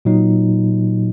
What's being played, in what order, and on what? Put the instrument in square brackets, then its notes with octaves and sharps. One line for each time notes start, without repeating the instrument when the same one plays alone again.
[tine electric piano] A#2 F#3 D#4